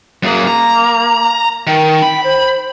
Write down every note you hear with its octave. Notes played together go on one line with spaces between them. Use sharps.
F#2 A#3 G#4
A#5
D#3 G5
B5
C5